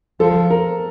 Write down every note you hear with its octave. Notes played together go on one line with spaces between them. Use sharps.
F3 A4
A#4